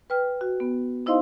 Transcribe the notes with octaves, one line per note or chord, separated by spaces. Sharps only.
B4 G5 F6
F#4
B3
D#4 E4 C5 D#5 F5 C6